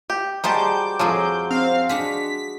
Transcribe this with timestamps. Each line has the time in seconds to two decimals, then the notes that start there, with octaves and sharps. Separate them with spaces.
0.10 G4
0.44 D#3 G3 G#3 F#4 C5 A5 D6 G6
0.99 F2 F3 F#3 G#3 F4
1.51 C4 F5
1.89 G#3 D4 F#4 B6